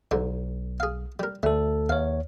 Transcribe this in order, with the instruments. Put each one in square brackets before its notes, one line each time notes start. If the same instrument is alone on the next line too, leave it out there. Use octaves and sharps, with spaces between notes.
[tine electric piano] B1 [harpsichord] G#2 D3
[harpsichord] G#4 F5
G3 A#4
[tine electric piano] D2 A4 [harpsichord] A3
[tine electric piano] D#2 C#5 [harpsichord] F5